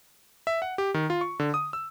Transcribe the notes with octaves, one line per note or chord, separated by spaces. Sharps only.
E5
F#5
G4
D#3
F4
C#6
D3
D#6
E6